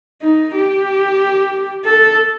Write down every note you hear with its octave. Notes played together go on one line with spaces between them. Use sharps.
D#4
G4
A4